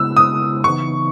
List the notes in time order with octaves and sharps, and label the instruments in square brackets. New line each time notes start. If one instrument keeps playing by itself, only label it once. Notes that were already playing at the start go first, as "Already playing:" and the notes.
Already playing: [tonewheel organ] C#3 G#3 B3 E4 [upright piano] E6
[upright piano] D#6
[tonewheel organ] C#3 E3 B3 D#4 [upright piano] C#6